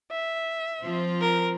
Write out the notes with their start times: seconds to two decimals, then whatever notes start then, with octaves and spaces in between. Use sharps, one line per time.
0.11 E5
0.83 F3 C4 F4
1.21 A#4